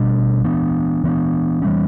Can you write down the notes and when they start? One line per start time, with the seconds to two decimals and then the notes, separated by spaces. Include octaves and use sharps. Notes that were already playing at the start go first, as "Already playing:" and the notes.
Already playing: B2 G3 D4
0.44 E3 B3 D4
1.04 E3 B3 D4
1.62 E3 G3 C#4